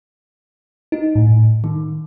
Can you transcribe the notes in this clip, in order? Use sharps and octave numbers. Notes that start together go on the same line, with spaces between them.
D#4
A2
D#3